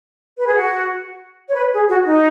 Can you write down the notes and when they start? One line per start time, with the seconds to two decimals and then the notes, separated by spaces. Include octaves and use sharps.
0.38 B4
0.47 G#4
0.55 F#4
1.49 C#5
1.55 B4
1.72 G#4
1.88 F#4
2.05 D#4